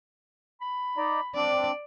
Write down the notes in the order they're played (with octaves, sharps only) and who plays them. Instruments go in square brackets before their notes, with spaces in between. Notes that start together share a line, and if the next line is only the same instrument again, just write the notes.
[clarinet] B5
[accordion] D#4 D5 A#5
[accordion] C4 D4 [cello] D5